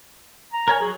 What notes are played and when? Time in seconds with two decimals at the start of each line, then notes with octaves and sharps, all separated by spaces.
0.53 A#5
0.68 A#4 C#5 G#5
0.81 F#3 G#4